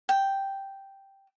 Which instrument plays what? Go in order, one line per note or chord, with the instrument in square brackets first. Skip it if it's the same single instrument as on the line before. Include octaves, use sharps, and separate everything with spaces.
[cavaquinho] G5